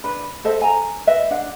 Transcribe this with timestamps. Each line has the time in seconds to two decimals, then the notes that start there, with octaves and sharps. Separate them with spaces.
0.04 D4 B4
0.44 A4 C5 D#5 E5
0.62 G#5 A#5
1.07 B4 D#5 E5
1.31 D4 F#5